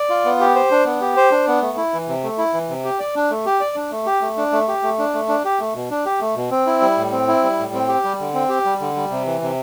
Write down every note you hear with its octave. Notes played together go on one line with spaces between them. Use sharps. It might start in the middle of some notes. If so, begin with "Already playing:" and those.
Already playing: D5
F4
B3
G4
C5
D4
B3
G4
C5
D4
B3
A3
E4
E3
C3
A3
E4
E3
C3
G4
D5
D4
A3
G4
D5
D4
A3
G4
A3
D4
A3
G4
A3
D4
A3
D4
G4
A3
B2
D4
G4
A3
B2
C4
E4
G3
A2
C4
E4
G3
A2
C4
G4
G3
D3
C4
G4
G3
D3
G3
C3
E3
C3